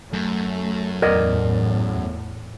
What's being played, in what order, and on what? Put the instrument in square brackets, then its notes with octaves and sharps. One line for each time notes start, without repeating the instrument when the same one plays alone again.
[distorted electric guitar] F#2 [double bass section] A3
[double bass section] E2 A2 [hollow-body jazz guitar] A#4 D5 D#5